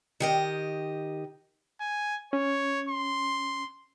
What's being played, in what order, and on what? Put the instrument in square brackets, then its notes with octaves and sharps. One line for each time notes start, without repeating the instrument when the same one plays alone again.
[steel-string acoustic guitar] D#3 G4 D#5
[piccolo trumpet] G#5
[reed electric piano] C#4 [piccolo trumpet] C#5
[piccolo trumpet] C6